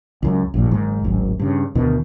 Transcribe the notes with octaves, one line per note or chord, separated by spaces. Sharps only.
C#2 F#2
A#1 G2 A#2
F#1 G#2 D#3
D1 G#1 F#2
G2 C#3
D2 B2 D#3